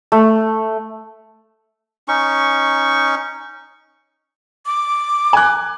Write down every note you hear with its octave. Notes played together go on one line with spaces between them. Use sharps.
A3
C#4 D#4 C#6
D6
G#5 F#6